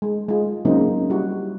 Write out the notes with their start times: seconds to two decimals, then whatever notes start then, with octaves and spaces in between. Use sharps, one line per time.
0.02 G#3
0.29 G#3 F4
0.65 C#3 F#3 G#3 A#3 C4 D#4
1.10 G3 E4 F#4